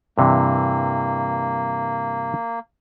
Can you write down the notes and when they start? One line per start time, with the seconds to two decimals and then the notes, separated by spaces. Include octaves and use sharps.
0.18 G2 C3 E3 A#3